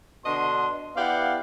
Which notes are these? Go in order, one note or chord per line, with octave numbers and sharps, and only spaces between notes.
B2 D3 D4 D#5 C6
B3 E4 G4 D5 F5 F#5